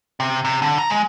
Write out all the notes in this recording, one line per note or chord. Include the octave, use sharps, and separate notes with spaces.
C3
C3
D3
A#5
G#3